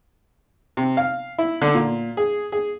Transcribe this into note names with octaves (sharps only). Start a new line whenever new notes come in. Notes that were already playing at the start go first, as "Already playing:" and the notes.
C3
F5
E4
D3
A#2
G#4
G#4